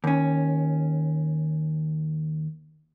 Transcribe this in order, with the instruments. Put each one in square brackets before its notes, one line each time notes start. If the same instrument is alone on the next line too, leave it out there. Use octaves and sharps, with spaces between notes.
[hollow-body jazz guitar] D#2 C#4